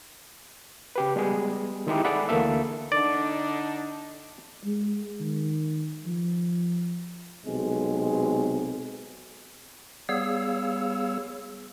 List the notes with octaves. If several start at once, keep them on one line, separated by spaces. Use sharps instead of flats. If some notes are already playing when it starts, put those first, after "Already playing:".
C#3 G4 B4
G3 G#3 B3 G#4
D#3 G#3 D#4 E4 G4
G#4 A4 D5 E5 F#5 B5
D2 E3 A#3 A4 E5
D3 D4 D#4 D5
G#3
D#3
F3
B1 C3 G#3
G3 B3 G#4 C#5 F5 E6